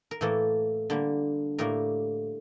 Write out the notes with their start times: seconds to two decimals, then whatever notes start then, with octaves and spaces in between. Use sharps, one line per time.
0.11 A#4
0.21 A2 E3 A#3 A4
0.90 D3 G3 A#3
1.58 A2 G3 A#3 A#4